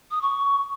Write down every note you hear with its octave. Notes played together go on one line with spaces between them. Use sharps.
D#6
C#6